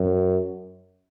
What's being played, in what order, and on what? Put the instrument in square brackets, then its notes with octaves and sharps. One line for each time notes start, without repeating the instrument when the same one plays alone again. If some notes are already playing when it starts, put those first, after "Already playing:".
Already playing: [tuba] F#2